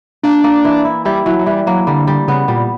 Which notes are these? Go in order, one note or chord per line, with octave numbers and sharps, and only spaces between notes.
A#3 D4
A#3
E3
E4
G3 E4
E3 F#3
F#3
E3 G3
F#3 A#3
D3 G3
G3
C#3 B3
A#2 G3